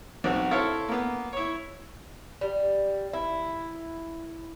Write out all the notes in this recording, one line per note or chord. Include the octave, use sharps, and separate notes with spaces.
B1 C4 F#4
E4 A4 C5 C#5 F5
A#3 B3
E4 C#5
G3
E4